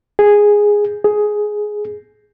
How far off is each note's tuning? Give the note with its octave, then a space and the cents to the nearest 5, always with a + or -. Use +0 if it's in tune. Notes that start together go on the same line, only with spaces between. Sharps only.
G#4 -5
G#4 +10